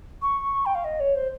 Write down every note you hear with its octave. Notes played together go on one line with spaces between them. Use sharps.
C#6
G5
F5
D#5
C#5
C5